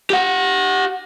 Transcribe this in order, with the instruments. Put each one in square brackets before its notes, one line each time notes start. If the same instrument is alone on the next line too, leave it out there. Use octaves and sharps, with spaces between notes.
[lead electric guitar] G4 F#5